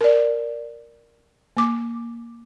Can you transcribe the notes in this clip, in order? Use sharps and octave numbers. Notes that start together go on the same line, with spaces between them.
A#4 D5
A#3 D6